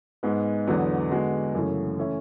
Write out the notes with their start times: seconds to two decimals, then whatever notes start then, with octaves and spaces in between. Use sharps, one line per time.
0.23 G#2 G#3 B3
0.67 E2 D3 F#3 B3
1.11 D3 G#3 B3 F#4
1.54 F#2 C#3 E3 A3 C#4
1.98 E3 A3 C#4 E4